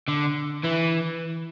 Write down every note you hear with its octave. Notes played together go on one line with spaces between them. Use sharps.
D3
E3